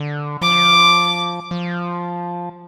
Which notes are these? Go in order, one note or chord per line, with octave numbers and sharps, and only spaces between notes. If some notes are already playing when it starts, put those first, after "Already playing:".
Already playing: D3
F3 D6
F3